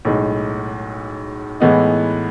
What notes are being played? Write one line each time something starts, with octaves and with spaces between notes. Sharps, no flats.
B1 A2 G#3
A2 E3 G#3 B3 D#4